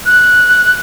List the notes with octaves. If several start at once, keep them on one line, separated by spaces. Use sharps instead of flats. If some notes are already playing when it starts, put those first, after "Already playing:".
F#6